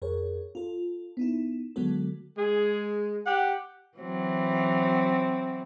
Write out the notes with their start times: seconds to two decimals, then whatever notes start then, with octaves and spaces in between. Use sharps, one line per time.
0.02 F2 G#4 A#4 C#5
0.55 F4 A4
1.17 B3 D#4 E4
1.76 D3 F#3 G#3 B3 F#4 A4
2.37 G#3 G#4
3.26 G4 F#5
3.98 E3 F#3 C4